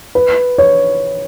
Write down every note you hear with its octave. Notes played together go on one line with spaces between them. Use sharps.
B4
C#5